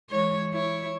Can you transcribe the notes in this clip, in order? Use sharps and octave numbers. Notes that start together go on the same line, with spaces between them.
E3 G#3 C#5
E4 C#5